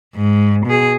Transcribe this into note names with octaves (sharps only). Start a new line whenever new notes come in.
G#2
B2 G#4